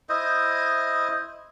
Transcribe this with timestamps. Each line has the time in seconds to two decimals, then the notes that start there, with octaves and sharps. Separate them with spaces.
0.09 E4 C5 D#5